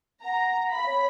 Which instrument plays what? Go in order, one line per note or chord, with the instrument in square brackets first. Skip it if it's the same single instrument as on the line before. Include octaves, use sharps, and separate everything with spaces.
[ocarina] F#5 [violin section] A#5
[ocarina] F5 [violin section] B5
[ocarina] C#5